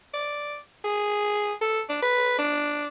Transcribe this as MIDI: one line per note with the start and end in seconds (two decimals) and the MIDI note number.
0.14 0.57 74
0.84 1.53 68
1.61 1.82 69
1.89 1.98 62
2.02 2.38 71
2.39 2.88 62